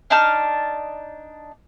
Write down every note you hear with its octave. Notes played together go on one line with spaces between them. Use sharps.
D4 D#4 A5 F6